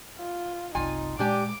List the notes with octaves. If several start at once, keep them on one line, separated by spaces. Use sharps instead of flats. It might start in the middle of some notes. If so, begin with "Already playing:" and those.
F4
F#1 C2 D#4 F4 G#5
A#2 G#3 D4 G4 G#5 D6